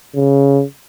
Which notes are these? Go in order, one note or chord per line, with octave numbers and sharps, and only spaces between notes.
C#3